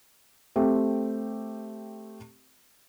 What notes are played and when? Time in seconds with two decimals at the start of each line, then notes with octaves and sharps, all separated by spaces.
0.56 A3 C4 G4